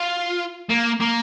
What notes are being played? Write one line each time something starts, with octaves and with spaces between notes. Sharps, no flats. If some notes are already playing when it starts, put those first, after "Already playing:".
Already playing: F4
A#3
A#3